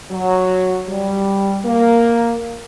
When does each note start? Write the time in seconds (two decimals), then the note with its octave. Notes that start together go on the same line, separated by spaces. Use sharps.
0.11 F#3
0.89 G3
1.65 A#3